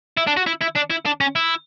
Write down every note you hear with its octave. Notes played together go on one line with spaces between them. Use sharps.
E4
D4
F#4
E4
E4
D4
E4
D4
C#4
E4